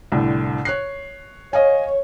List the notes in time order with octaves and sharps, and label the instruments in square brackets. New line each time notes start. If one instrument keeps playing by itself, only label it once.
[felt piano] C2 A2 D3
C#5 F#6 C7
[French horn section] C#5 [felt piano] D#5 F5 G#5